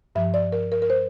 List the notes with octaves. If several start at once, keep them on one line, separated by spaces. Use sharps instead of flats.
G2 F3 E5
D5
A#4
A#4
A#4
C5